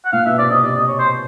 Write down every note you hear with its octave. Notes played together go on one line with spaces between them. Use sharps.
F#5
A#2 F5
B2 E5
C3 D5
C3 D#5
C3 D5
D#5
C#5
C5